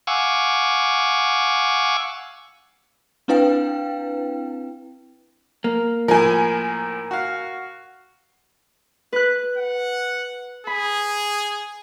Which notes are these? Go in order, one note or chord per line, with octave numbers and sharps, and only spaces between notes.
F5 F#5 G#5 C#6 D6 E6
C4 D4 E4 B4 F5 G5
A#3
A2 F3 A#4 G#5
F#4 F5
B4 F#6
F#5
G#4 B5